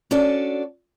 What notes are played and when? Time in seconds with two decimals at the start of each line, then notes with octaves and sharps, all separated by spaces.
0.11 C#4 D4 F#4 A4 D5